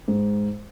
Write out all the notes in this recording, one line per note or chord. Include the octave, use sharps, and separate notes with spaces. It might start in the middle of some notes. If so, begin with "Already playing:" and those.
G#2